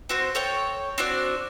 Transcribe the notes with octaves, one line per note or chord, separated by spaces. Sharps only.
C4 F#4 C5
A4 C#5 G5
C4 D4 F#4 D5